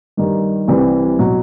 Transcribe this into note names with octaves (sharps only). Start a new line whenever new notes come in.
G2 D#3 G3
C2 C3 E3 G3 C4
B2 F#3